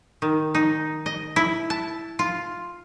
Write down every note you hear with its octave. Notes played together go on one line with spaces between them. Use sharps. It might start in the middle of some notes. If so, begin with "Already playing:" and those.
D#3
D#4
D#5
E4
A5
F4